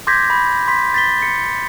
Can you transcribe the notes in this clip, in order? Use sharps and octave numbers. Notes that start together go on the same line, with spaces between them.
C6 D6 G6 G#6 A#6 B6
B5
C6 B6
A6 B6 G7
C#7